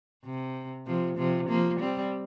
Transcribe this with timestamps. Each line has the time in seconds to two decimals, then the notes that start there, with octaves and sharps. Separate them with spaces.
0.24 C3
0.87 C3 F3
1.18 C3 F3
1.49 F3 A#3
1.80 G3 C4